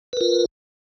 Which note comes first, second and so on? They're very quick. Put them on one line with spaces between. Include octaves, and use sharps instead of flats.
B4 A#4 F4